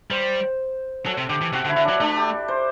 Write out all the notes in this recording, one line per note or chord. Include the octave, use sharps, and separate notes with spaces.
G3 C5
F#3 A4
C3
D3 G4
E3
C3 F#4
D3
E4
D3
F#3 D4
A3 D4
G4
C5